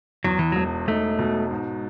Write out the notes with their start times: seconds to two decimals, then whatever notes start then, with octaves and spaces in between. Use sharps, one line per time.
0.24 E2 F#3
0.39 E3
0.52 E1 F#3
0.88 A3 D#4
1.19 B2
1.51 G#2